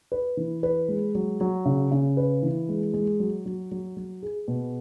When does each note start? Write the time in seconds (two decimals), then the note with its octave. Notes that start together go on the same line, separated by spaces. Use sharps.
0.12 B4
0.37 E3
0.63 B4
0.88 G#3
1.15 F#3
1.41 F#3
1.65 C#3
1.91 C#3
2.17 B4
2.43 E3
2.69 G#3
2.93 G#3
3.20 F#3
3.46 F#3
3.71 F#3
3.97 F#3
4.22 G#4
4.48 B2